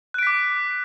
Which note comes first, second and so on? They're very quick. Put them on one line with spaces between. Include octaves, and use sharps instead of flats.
F#6 D7 B6 D6